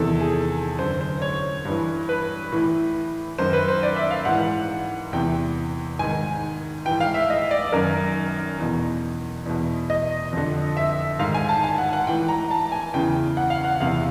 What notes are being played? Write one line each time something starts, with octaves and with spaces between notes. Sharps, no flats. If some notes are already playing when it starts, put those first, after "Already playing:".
Already playing: E2 C3 D#3 A4
G#4
F#2 D3 C5
C5
C#5
G2 E3
B4
A2 E3
F#2 D#3 C5
B4
C5
D5
E5
F5
G#2 E3 F#5
E2 C3 E3 G5
G#2 D#3 G#5
G#2 E3 G5
F5
E5
D#5
D5
F#2 D#3 A#4
E2 B2
E2 B2
D#5
F2 D3
E5
G#2 D#3 F5
G#5
A5
G#5
F#5
F#5
A2 E3 G5
A#5
A5
G#5
E2 C#3 E3 G5
F#5
F5
F#5
E2 C3 E3 F5